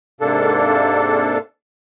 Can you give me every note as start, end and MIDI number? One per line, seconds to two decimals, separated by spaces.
0.21 1.38 44
0.21 1.38 48
0.21 1.38 58
0.21 1.38 62
0.21 1.38 69